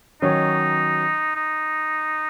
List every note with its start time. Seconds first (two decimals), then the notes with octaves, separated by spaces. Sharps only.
0.21 D#3 F#3 C#4 D#4
1.36 D#4